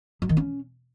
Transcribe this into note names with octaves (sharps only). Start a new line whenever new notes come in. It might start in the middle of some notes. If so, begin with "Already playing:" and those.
F#3
D#3
C#4